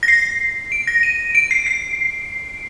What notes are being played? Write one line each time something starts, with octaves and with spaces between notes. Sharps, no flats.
A#6
C7
D7
A#6
D#7
D7
C7
C7